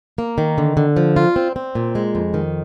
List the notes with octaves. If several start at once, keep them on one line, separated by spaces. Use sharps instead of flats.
A#3
D#3
D3
D3
F3
F4
C4
C4
A#2
G#3
F2
D#3